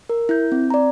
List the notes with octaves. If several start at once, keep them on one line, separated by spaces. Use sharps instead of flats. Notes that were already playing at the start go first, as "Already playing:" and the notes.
A#4
E4 G6
C4
D5 A#5